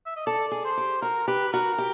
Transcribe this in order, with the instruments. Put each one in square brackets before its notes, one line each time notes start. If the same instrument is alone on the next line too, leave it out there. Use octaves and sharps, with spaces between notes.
[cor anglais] E5
D#5
[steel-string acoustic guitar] A4 [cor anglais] D5
[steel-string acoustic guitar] G#4
[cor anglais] C5
[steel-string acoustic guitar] G4
[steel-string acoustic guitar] F#4 [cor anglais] A#4
[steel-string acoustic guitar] G4 [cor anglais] B4
[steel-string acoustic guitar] F#4 [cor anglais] A#4
[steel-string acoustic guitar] G4